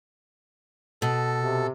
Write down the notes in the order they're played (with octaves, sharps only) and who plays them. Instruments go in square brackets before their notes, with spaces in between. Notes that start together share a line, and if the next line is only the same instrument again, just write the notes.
[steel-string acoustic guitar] B2 [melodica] A4
[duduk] C3